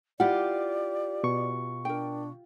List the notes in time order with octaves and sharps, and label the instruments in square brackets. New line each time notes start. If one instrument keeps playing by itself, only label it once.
[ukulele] E4 F#5 [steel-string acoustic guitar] F4 G4 [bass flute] D5
[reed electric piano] B2 C#6
[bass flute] D4 [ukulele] A#4 G5